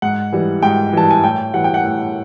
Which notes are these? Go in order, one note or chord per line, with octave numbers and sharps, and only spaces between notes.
G#2 F#5
E3 G3
G#2 G5
E3 G3 A5
G#5
A2 G5
E3 G3 F#5
G5
F#5
A2